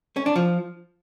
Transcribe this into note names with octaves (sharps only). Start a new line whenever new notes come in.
C#4
D4
F3